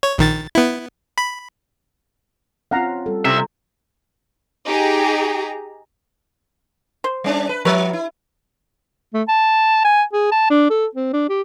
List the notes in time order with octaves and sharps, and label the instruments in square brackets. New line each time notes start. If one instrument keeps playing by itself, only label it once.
[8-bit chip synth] C#5
A#1 D#3 A6
B3 E4
B5
[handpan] C4 C#4 F4 [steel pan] F5 F#5 A#5
[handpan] G3 A4
[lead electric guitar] C2 E5 [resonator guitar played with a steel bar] C3
[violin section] D#4 G4 G#4 A#5
[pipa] C5
[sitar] G3 C#4 D4
B4
[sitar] F3 [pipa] B4 C#5 E5
[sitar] E4
[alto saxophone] A3
A5
G#5
G#4
A5
D4
A4
C4
D4
G4